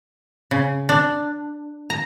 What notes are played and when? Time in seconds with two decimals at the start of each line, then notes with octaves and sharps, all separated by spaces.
0.51 C#3
0.89 D4
1.90 A#5